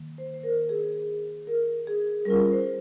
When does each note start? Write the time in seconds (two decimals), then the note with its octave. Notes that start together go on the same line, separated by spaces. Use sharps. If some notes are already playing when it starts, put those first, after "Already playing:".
Already playing: D#3 A#3
0.18 C5
0.34 C5
0.43 A#4
0.69 G#4
1.47 A#4
1.87 G#4
2.25 G3 C#4 F4 A#4
2.52 C5